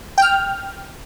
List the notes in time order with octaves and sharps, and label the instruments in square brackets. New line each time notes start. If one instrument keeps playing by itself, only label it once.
[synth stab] G5 F6